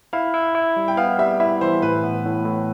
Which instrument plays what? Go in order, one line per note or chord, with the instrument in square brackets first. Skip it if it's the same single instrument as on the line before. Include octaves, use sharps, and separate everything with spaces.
[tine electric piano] E4 [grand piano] F5
[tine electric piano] E4
E4
G3
[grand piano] G5
[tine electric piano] B3 [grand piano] F5
[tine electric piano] G3 [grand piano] E5
[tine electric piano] E4 [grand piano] E5
[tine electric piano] E3 [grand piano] C5
[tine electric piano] A2 [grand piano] B4
[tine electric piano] B3
A2
A2